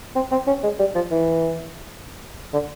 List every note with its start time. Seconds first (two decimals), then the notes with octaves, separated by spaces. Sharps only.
0.15 C4
0.32 C4
0.47 C#4
0.63 G#3
0.79 G3
0.95 F3
1.11 E3
2.53 D3